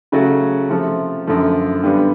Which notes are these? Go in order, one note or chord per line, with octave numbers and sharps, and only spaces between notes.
C#3 F#3 A3 C#4 F#4
C3 F3 A3
F#2 D3 F3 A3
G2 D3 G3 B3